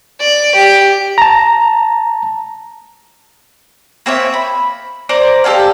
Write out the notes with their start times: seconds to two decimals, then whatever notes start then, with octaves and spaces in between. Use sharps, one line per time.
0.20 D5
0.55 G4
1.18 A5 A#5
4.06 A#3 C4 C#5 E5
4.34 B5
5.09 C5 D5 A#5 D6
5.44 G4 A4 C#5 F5